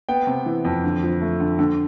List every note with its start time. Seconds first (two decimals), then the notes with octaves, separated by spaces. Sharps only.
0.09 B3 G5
0.27 C3
0.46 E3
0.65 F2
0.84 D3
1.03 F3
1.21 A3
1.40 D3
1.59 D3